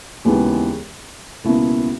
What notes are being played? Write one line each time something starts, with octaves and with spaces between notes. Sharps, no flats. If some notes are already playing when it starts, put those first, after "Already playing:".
D#2 C#3 E3 G#3 B3
C#2 B2 A#3 E4